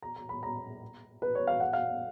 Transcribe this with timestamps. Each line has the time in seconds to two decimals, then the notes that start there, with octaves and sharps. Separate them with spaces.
0.02 A#5
0.16 A#5
0.29 B5
0.43 A#5
1.22 B4
1.35 C#5
1.47 F5
1.60 F#5
1.73 F5